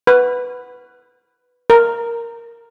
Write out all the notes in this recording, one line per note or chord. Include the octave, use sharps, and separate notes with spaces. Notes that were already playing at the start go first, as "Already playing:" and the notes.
B4
A#4